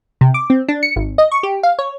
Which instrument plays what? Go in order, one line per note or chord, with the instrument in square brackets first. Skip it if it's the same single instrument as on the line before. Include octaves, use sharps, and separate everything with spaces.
[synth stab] C3
D6
C4
D4
C#7
G#1
D#5
C#6
G4
F5
C#5